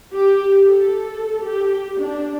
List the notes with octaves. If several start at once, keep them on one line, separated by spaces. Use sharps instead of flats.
G4
A4
G4
D4